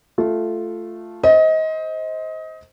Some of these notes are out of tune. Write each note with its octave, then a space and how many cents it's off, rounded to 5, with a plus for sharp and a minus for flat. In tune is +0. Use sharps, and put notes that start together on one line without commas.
A3 -5 F4 +0
C5 +0 D#5 +25